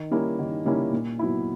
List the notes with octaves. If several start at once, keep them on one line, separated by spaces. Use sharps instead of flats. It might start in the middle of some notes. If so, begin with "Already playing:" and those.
Already playing: D#3
G3 A#3 C#4 E4
D#3
G3 A#3 C#4 E4
A#2
F#3 B3 E4